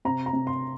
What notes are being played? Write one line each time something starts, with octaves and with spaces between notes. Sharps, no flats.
C3 A#5
A#5
C3
C6